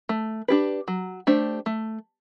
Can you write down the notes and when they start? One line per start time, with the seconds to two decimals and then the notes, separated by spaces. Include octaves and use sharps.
0.09 A3
0.48 D4 G4 B4
0.88 F#3
1.27 A3 D4 G4 C5
1.66 A3